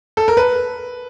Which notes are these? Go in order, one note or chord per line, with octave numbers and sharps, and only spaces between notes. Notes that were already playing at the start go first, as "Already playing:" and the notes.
A4
A#4
B4